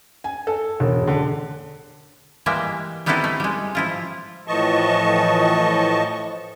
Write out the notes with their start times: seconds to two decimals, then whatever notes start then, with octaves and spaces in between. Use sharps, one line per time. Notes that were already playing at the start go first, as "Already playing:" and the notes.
0.24 G#5
0.47 A4
0.80 E1
1.07 D3
2.46 E3 G3 G#3 A#3 E5 G5
3.06 G3 B3 C4 D#4 E4 A4
3.24 A3
3.40 G3 G#3
3.75 F3 E4 F4
4.47 A2 E3 F3 D#5 A5 C#6